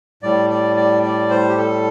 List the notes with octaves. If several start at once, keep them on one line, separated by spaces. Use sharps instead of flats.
A2 G3 D5
D5
D5
D5
C5
G4
A4